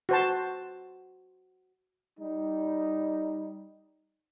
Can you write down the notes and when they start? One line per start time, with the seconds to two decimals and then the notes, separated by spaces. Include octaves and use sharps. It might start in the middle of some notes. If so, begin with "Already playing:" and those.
0.09 F#4 C5 A5
2.19 G3 D#4